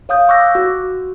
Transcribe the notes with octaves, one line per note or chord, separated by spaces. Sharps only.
C#5 F5 D#6 G6
C#6 D6 E6 F#6 A#6
F#4